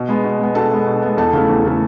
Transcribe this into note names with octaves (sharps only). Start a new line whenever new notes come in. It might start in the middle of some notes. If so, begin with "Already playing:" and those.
Already playing: B2
G#3 B3
B2
G#3 B3
B2 A4 A5
G#3 B3
B2
G#3 B3
E2 A4 A5
C#3 E3 A3
E2
C#3 E3 A3